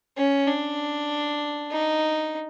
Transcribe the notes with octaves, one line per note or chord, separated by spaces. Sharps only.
C#4
D4
D#4